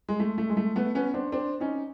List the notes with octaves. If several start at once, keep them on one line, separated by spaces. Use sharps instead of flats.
G#3
A3
A3
G#3
A3
A3 B3
B3 C#4
C4 D4
C4 D4
C#4 D#4